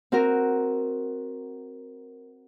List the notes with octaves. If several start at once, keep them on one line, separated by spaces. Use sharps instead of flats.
C4 F#4 A#4